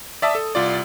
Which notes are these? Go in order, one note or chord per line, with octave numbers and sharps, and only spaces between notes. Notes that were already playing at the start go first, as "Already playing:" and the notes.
D5 E5 A5 D#6
A4
C2 F4 D5